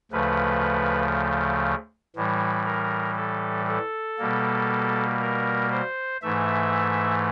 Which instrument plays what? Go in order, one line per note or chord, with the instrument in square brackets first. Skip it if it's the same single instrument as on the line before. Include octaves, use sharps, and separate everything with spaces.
[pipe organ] D2 C#3 F3 A3 B4
A2 E3 G3
A#4
A4
A4
B2 G3 A#3
A#4
C5
G#2 E3 A3 E5